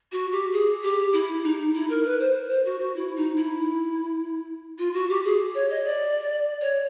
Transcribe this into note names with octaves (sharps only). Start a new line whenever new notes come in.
F#4
G4
G#4
G4
E4
D#4
E4
A#4
B4
C5
C5
F#4
F#4
E4
D#4
E4
F4
F#4
G4
G#4
C#5
D#5
D5
C#5